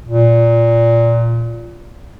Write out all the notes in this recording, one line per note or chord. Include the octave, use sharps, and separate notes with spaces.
A#2